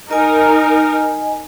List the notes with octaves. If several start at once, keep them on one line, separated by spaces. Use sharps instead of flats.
D#4 A#4 D#5 G#5